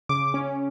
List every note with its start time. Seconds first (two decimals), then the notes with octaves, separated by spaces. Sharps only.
0.09 C#3 D6
0.34 C#4